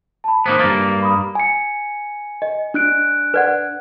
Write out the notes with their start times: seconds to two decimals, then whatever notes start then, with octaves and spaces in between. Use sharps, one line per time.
0.24 A5 B5
0.46 D#3 A#3 B3 C5
0.60 G2 A#3 A6
1.01 A#5 B5 D#6
1.35 G#5 C#7
2.42 D#5
2.74 D4 F#6 D7
3.34 B4 D5 F#5